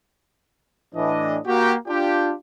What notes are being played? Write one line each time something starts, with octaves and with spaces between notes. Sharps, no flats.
A2 E3 D4 D#5
A#3 F#4 G4
D4 F4 G4